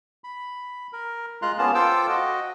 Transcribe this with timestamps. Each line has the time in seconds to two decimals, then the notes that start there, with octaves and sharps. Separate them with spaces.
0.24 B5
0.93 A#4
1.42 G#3 F4 A#5 C6 F#6
1.59 A#3 B3 C#4 F4 G#4 A5
1.75 F4 A4 C5 G5 D6 E6
2.09 F#4 D#5